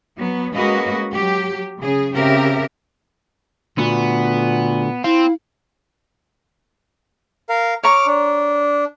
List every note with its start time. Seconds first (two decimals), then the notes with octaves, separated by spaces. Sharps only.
0.16 F#3 B3
0.54 G#3 A#3 C#4 F#4 B4 D#5
1.13 F#3 G4
1.81 C#3 G#4
2.14 C#3 C4 G4 A#4 E5
3.78 A#2 D3 A3 B3 F#4
5.04 C4 E4 F5
7.49 A#4 F5
7.83 C#5 A#5 C#6 D6 F6
8.07 D4